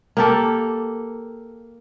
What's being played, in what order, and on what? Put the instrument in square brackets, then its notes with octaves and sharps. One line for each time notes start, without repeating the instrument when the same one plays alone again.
[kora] A#3 G4 A4